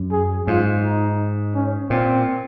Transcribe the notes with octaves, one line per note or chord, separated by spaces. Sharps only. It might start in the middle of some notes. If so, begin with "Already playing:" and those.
Already playing: F#2
G#4
G#2 F4
D#4
C#4
A#2 C4